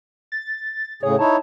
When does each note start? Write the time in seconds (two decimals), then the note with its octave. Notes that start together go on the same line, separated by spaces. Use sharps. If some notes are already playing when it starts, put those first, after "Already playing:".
0.32 A6
1.03 A2 C#3 G#4 C#5
1.19 D#4 E4 C#5 A5